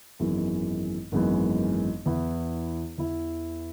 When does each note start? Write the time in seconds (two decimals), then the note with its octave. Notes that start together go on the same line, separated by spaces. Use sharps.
0.20 G#1 F#2 E3 G#3 B3
1.12 G#1 F#2 E3 G#3 B3
2.05 E2 E3 B3 E4
2.98 E2 E3 B3 E4